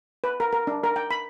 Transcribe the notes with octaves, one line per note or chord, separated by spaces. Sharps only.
B4
A#4
A#4
D4
A#4
G5
B5